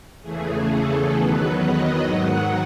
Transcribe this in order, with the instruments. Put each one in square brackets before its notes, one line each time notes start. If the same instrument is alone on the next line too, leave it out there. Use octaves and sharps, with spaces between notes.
[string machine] E2 C#3 E3 A3 G#4
A4
E2 D#3 F#3 B3 B4
D#5
G#2 D#3 F#3 F#5